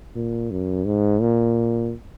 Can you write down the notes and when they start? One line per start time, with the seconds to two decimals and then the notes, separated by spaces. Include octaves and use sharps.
0.15 A#2
0.51 F#2
0.86 G#2
1.21 A#2